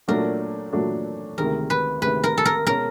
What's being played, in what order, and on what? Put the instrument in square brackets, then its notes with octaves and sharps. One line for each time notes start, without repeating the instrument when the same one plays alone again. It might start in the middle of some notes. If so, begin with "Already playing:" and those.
[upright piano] A#2 F#3 A3 D4 F#4 [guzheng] A#4
[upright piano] A#2 F#3 A3 D4 F#4
[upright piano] D2 C3 D#3 G#3 [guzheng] A#4
[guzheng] B4
[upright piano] D2 C3 D#3 G#3 [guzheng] B4
[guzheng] A#4
A4
A#4
[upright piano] B2 G#3 C#4 [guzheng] A#4